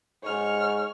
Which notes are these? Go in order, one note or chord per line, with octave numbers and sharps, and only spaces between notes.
G#2 C#5 F6